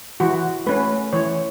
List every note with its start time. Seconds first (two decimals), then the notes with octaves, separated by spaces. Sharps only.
0.20 E3 F#4
0.66 A3 C#4 B4
1.13 E3 C#5